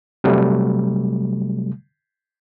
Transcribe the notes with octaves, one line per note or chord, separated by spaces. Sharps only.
C3 F#3 G3 A3